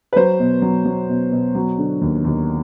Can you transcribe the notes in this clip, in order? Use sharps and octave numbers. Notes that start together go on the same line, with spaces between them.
B4
F#3 C5
B2
F#3
F#3
B2
B2
F#3
D3
D#2
D#2